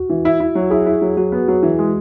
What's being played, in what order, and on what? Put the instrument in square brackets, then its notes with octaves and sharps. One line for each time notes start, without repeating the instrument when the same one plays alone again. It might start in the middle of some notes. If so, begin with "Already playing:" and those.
Already playing: [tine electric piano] F#4
[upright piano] E3
E4
E4
F#3
[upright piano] E4 [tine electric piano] G#4
[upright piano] E4
F#3
[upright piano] F#3 [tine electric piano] F#4
[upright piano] B3
F#3
E3
G#3